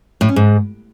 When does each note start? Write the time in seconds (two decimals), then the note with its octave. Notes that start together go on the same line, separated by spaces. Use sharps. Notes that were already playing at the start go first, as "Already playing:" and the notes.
0.21 A2
0.29 C#4
0.36 G#2